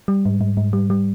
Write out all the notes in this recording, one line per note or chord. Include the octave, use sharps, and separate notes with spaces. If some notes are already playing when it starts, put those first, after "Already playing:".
G3
G#2
G#2
G#2
G3
G3